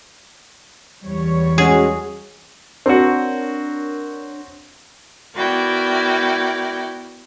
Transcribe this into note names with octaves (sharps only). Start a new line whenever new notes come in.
E2 G3 C#5
G#3 C#4 F#4 G#4
C4 D4 F#4 A#4 C#5
B3 E4 F#4 A#4 D5 G5